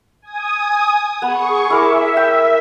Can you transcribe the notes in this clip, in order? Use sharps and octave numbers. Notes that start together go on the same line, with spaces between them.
G#5 D#6
B3 G#4 C#6
E4 A#4 E5 D6
G5